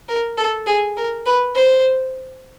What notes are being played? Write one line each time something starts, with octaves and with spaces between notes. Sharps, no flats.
A#4
A4
G#4
A#4
B4
C5